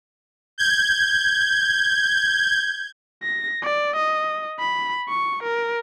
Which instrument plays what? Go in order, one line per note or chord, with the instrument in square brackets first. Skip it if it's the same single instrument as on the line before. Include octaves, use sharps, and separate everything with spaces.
[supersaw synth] G6 G#6
[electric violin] A#6
D5
D#5
B5
C#6
A#4